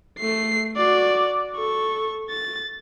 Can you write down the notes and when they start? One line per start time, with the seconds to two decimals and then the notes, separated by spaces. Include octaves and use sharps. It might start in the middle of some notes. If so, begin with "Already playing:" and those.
0.20 A3 C7
0.77 F#4 D5
1.56 A4 C#6
2.30 A6